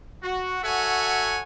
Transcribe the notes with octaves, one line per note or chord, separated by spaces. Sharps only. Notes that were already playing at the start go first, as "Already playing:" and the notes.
F#4
F#4 A4 C#5 E5 F#5 G#5